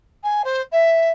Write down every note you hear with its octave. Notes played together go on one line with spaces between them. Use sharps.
G#5
C5
E5